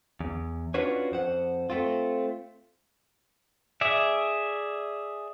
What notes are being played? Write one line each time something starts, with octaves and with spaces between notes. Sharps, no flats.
E2
C#4 D4 F4 F#4 B4 C#5
F2 C5 F#5
A3 C4 F4
G#4 D5 E5